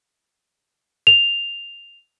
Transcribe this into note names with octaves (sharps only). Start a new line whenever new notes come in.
F7